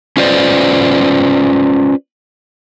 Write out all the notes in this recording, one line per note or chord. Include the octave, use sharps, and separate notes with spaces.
C#4 F4 B4 C5 D5